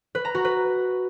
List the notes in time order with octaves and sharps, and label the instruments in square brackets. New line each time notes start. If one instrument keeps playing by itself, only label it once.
[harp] B4
A#5
F#4
B4